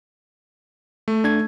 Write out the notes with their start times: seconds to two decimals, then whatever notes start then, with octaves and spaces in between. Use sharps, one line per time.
1.08 A3
1.24 D4 G#6